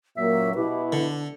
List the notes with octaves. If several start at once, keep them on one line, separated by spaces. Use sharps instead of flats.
F#2 A#2 F#3 A#3 E5
B2 E4 G4 B4
D3 D4